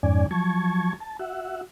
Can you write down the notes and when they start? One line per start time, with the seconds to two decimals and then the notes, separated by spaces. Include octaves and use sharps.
0.03 F2 G#2 D#3 C#4 D5 G#5
0.31 F3 F#3 A5 C#6 G#6
1.00 A5
1.19 F#4 E5 F#5